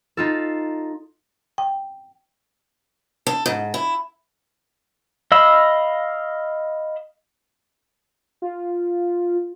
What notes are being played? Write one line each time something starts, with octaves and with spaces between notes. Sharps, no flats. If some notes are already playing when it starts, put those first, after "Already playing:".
D#4 F4 A4
G5
A4
G#2
E4
D#5 F5 B5 E6
F4